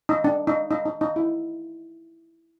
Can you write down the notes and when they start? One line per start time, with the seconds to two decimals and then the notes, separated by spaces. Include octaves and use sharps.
0.09 D#4
0.24 D4
0.47 D#4
0.71 D#4
0.85 D#4
1.01 D#4
1.16 E4